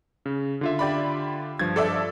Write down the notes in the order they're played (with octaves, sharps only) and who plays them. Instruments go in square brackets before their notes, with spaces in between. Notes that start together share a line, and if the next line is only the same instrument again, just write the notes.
[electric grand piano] C#3
D3 F4 E5
[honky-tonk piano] G4 D5 B5
[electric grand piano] G2 F3 [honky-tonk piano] G#6
[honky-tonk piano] A4 D5 E5